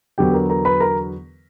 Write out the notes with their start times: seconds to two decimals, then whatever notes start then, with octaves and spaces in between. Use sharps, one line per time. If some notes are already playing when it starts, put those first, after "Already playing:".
0.18 E2 D3 F#3 B3 G4 G5
0.33 A#4 A#5
0.49 A#4 A#5
0.65 B4 B5
0.80 A#4 A#5